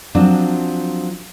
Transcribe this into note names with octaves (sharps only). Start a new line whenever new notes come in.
F3 F#3 C4 D4